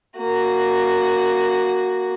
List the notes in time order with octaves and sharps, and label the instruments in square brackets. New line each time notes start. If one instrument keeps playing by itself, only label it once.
[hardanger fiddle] A#3 F#4